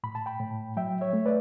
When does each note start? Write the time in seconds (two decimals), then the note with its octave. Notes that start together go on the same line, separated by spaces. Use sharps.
0.04 A2 B5
0.15 A5
0.26 G5 B5
0.40 A2
0.77 F#3 E5 G5
1.01 C#5 E5
1.13 A3
1.26 B4 D5